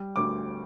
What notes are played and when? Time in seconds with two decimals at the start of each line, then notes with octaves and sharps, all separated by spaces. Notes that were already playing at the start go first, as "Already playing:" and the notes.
Already playing: G3
0.16 D2 D6